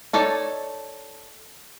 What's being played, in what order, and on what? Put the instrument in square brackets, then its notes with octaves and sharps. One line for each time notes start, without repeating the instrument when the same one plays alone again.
[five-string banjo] D#4 A4 C#5 D5